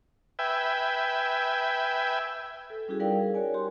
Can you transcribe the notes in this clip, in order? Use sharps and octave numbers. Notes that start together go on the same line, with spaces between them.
B4 E5 G5 G#5
A4
G3 C#4 E4 F#4 G#4
G3 D#4 A#4 D5 F5 G5
G#4
F#4 A#4 C#5 D5 G#5
F#4 G4 C6